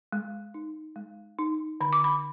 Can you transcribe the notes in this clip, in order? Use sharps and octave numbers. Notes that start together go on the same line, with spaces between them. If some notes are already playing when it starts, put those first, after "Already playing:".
G#3
D#4
G#3
D#4
D3 B5
D6
B5